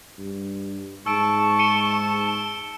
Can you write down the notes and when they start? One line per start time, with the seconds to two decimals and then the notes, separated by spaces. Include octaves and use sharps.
0.18 G2
1.06 G#2 A5 C#6 E6 D7
1.59 C#7 D#7 G7